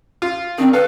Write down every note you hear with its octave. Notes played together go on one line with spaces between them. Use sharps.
F4
D#3 C4 D4
A4 B4 F5